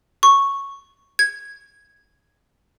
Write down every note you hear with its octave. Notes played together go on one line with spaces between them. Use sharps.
C#6
G#6